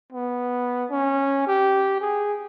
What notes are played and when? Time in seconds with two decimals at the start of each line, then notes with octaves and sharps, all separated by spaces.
0.13 B3
0.90 C#4
1.47 G4
2.01 G#4